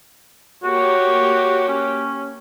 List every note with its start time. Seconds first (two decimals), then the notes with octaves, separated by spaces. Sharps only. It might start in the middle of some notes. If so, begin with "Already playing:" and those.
0.64 A#3 F#4 G4 C#5
1.68 C#4